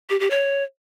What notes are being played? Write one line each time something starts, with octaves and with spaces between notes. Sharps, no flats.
G4
G4
C#5